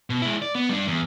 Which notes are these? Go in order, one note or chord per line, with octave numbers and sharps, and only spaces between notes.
B2
G#3 E4
D5
B3
G3 D4
E2